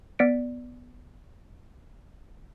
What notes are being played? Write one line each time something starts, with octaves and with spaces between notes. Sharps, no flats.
B3 D5 B6 C#7 D7